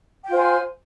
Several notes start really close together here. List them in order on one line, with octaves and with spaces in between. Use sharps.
G5 F4 C5 G#5